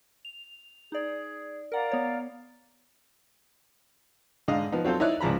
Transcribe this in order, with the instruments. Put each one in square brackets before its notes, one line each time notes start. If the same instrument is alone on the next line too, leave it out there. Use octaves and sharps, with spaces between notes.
[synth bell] F7
[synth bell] D#4 D5 [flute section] G#4
[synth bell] A#4 F#5 [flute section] D5 F5 A#5
[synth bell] B3 C#5
[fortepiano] G#2 D3 D#5 F5
F3 B3 D#4
F#3 C4 F4 A4 C5
D#4 E4 C#5 D5 F#6
C#2 G#2 F3 A#5 B5